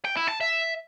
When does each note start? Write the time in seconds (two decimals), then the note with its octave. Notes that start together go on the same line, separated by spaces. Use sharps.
0.05 G5
0.17 E4
0.29 A5
0.40 E5